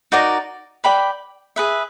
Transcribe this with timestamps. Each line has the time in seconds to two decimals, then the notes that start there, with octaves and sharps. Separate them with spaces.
0.12 D#4 F#4 A#4 D5
0.84 B4 D5 G5 B5
1.56 G#4 B4 E5